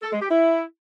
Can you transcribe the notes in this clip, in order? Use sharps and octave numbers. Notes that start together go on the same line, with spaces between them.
A4
G#3
G4
E4